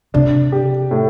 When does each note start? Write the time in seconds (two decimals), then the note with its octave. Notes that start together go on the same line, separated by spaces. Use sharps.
0.14 C3 D4
0.52 G4
0.91 A2